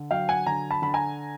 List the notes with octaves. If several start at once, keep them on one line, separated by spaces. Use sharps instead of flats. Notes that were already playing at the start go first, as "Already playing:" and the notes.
Already playing: D3
F#3 F5 G5
F#5 G#5
D3 G#5 A#5
A5 B5
D3 B5
G#5 A#5